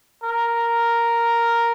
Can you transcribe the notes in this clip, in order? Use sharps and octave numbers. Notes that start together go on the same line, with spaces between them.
A#4